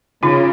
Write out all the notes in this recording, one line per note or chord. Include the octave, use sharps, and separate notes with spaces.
C#3 D#4 F4